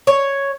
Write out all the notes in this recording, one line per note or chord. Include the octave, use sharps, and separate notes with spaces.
C#5